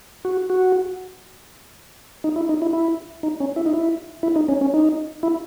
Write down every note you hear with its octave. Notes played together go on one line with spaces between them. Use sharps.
F#4
F#4
D#4
E4
D#4
E4
E4
D#4
C#4
E4
D#4
E4
E4
D#4
C#4
C#4
D#4
E4